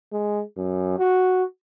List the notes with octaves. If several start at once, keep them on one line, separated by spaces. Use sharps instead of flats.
G#3
F#2
F#4